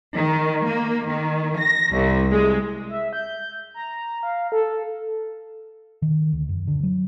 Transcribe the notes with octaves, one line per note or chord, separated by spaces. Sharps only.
D#3
A#3
D#3
A#6
C2
G#3
E5
G6
A#5
F5
A4
D#3
D2
F#2
D3
F#3